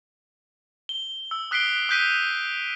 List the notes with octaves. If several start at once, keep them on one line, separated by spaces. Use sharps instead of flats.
G7
E6
D#6 F#6 B6 C7 D7 G7
D#6 F#6 G6 B6 D#7